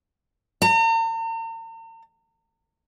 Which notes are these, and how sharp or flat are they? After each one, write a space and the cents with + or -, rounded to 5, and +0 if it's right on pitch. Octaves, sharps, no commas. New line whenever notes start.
A#5 -45